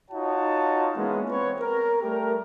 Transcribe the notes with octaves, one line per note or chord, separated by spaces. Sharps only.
D#4 F4 F#4 C#5 F#5 A5
E3 G#3 A#3 B3 C#4
B3 C4 B4 C#5
A#4
G3 A3 G4 A#4